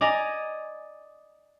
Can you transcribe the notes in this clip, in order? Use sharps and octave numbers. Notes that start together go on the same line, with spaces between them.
D5 D#5 G#5 A#5